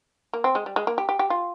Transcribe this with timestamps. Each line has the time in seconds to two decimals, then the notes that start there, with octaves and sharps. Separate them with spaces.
0.33 A#3
0.44 C4
0.55 G#3
0.66 G3
0.76 G#3
0.87 A#3
0.98 G4
1.09 G4
1.19 G4
1.30 F4